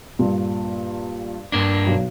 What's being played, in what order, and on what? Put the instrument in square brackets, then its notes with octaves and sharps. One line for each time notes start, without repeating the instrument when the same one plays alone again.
[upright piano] G2 A#2
[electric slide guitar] G2 A#3 D4
[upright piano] B1